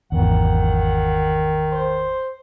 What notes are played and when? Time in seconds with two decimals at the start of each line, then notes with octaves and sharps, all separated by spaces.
0.12 G#1 E2 D#3 F#5
1.72 C5